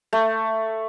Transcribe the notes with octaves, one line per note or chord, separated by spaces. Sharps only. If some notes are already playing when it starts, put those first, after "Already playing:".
A3